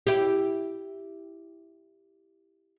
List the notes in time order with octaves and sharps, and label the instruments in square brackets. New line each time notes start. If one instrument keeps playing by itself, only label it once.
[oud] E4 G4